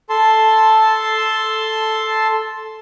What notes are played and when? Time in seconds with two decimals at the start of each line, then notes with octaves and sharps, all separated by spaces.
0.09 A4 A5 C6